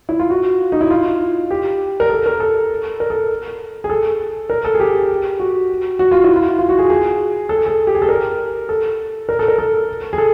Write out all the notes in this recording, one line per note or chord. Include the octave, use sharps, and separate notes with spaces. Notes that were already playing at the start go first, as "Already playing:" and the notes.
E4
F4
F#4
D#4
E4
F4
G4
A#4
A4
A#4
A4
A#4
A4
G#4
A4
A#4
A4
G#4
G4
F#4
F#4
F4
E4
F4
F4
F#4
G#4
G#4
A4
G#4
A4
G4
G#4
A4
A#4
A4
A#4
A4
A#4
A4
G#4
A4